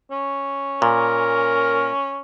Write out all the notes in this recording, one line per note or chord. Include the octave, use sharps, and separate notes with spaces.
C#4
A#2 A#4